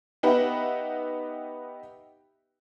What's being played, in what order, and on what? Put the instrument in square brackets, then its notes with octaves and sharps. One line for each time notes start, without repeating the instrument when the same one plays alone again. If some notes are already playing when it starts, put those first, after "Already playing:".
[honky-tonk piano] B3 D#4 G4 B4 E5 F#5